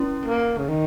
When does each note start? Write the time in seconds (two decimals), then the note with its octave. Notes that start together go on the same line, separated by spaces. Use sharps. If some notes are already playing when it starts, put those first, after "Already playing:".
Already playing: C#4 E4
0.26 A#3
0.58 C#3
0.69 D#3